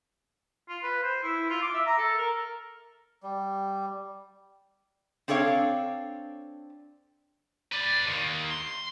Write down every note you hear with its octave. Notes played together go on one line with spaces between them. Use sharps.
F4
B4
C5
E4
F4
D6
E5
A#5
A4
A#4
G3
C4 D4 A4 C#5 F5
B4 D5
D#2 D#3
C6